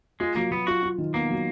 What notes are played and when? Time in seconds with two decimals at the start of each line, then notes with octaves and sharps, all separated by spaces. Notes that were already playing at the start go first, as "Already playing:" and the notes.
0.20 G#3 F4
0.36 F#3 A#3
0.51 F#3 B3
0.67 F4 F#4
0.83 F4
0.98 D#3
1.14 A#3 B3
1.30 F#3